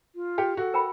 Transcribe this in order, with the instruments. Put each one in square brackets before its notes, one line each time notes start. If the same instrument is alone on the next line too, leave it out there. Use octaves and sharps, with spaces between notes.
[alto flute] F4
[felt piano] G4 [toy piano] G5
[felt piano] F#4 [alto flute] A4
[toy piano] A#4 G5 B5